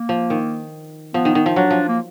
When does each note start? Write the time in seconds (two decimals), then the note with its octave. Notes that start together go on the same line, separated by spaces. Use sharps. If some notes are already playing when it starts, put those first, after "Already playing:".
Already playing: A#3
0.09 F3
0.30 D#3
1.14 F3 B3
1.25 D#3
1.35 D#3
1.46 F3
1.56 F#3 D4
1.70 F3
1.89 A#3